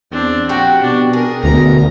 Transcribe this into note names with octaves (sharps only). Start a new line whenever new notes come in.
E2 C4 D4
A#1 A2 F#4 G4 G5
B2 D4
G#4 A#4
D2 B2 A#4 A#5